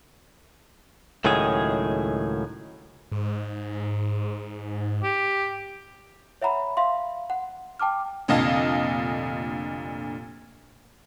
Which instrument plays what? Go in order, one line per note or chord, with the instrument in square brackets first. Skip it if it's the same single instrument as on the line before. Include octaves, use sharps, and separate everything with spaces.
[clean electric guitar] C#2 A2 D#3 F#3 G#4
[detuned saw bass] G#2
[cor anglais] G4
[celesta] C#5 E5 F#5 A#5 B5
E5 F5 C6
F#5
G5 A5 D6 F6
[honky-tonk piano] F1 A#2 D3 D#5 F5 A5